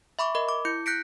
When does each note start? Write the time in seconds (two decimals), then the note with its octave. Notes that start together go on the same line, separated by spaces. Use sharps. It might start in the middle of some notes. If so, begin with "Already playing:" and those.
0.19 E5 B5 C#6 D6
0.35 A#4 D#5 B5
0.49 D6
0.65 E4 G6 C#7
0.86 F#6 G6 A#6 B6 C#7 D7